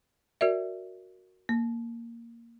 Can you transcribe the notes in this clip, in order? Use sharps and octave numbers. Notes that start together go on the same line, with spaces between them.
F#4 A#4 D5 E5
A#3